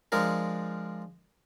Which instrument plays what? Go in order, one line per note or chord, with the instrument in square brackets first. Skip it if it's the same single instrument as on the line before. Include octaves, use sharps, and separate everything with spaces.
[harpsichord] F3 G#3 D4 A#4